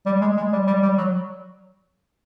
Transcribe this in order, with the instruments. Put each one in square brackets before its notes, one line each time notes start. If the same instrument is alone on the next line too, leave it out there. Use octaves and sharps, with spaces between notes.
[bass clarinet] G3
G#3
G#3
G3
G3
G3
F#3